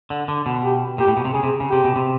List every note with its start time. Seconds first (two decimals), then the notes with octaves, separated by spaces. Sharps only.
0.10 D3
0.28 D3
0.46 B2
0.64 G4
0.98 A#2 G4
1.08 A2
1.17 B2
1.25 C3
1.34 C#3 G#4
1.43 C3
1.60 C#3
1.70 C3 G4
1.84 B2
1.96 C3